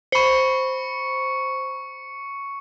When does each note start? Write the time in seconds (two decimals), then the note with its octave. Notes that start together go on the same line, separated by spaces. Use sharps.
0.12 C5 B5 C#6 C#7